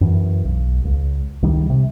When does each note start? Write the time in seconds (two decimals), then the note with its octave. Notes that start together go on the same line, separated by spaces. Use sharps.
0.01 F#2 E3
0.45 B1
0.85 C#2
1.42 C#2 D#3 G3
1.70 C3